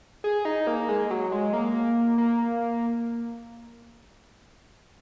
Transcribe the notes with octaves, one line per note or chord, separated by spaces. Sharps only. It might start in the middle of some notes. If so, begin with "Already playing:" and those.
G#4
D#4
A#3
G#3
F#3
G#3
A#3
A#3